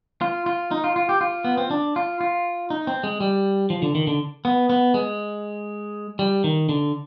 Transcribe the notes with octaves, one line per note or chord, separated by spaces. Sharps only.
F4
F4
D#4
F4
F4
G4
F4
B3
C4
D4
F4
F4
D#4
C4
G#3
G3
F3
D3
D#3
D3
B3
B3
G#3
G3
D#3
D3